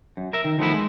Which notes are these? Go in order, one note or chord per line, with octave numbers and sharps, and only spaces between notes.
F#2
A#4 E5
D#3
D#3 F3 A3 B3 E4
G#3